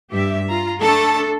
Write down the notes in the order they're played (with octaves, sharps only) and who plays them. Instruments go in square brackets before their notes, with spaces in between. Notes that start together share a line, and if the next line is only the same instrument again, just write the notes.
[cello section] G2 G4 E5
[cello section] F4 [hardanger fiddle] A#5
[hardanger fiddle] A3 A5 [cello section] D4 A4